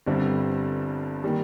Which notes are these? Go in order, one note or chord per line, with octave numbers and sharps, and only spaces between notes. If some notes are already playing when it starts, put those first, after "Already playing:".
G1 G2 D3 G3 C4
D#3 G3 A#3